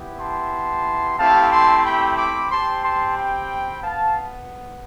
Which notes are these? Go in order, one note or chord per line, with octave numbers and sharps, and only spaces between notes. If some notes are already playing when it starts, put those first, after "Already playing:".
Already playing: B3 E4 G4
A5 C6
A3 C4 E4 G4 F5 A5
A5 C6
G5 B5
B5 D6
C4 G4 A5 C6
A5 C6
G5 B5
B3 F5 A5